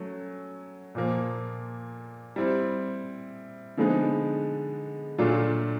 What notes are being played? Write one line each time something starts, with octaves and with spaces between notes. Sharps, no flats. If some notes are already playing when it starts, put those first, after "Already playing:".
Already playing: F#3 A3 C#4
A#2 F3 A#3
G3 C4 E4
D3 F3 G#3 B3 D#4
A#2 F#3 A3 D4 F4